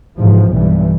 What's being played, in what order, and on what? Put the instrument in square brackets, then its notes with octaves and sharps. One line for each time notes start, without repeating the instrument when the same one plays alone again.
[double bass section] G#2 C3 E3 F3
B1 G2 E3 G3